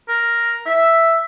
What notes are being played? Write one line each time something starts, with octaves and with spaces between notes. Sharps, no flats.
A#4
E5